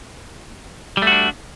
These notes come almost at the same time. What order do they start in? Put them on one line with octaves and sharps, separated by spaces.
G3 A3 F#4 D4